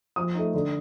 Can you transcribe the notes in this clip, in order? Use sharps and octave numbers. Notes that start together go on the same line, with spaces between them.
F3 D#6
A3 D#4
D3